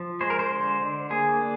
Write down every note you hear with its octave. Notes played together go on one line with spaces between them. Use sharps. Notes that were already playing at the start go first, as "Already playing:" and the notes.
Already playing: F3
G#3 C5
A#4
C5
D3
D3
A#3 G#4
D4